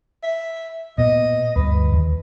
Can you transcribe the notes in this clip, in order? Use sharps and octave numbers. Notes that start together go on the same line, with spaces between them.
E5
A#2 B3 D#5
D2 G2 B4
D#2